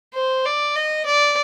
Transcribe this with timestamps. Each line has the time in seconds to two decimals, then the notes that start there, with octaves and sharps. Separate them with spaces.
0.14 C5
0.45 D5
0.76 D#5
1.05 D5